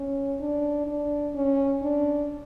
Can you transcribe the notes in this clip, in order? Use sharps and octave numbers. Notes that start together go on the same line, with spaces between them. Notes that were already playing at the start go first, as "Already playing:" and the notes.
Already playing: C#4
D4
D4
C#4
D4